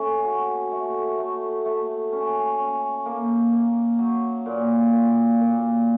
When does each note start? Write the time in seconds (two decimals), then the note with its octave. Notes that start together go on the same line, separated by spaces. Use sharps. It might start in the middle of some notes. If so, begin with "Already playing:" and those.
Already playing: A3 C#4
0.24 F#4
0.72 A3
1.18 A3
1.65 A3
2.13 C#4
2.58 C#4
3.06 A#3
3.52 A#3
3.99 F#3
4.46 A#2
4.93 A#2
5.41 A#2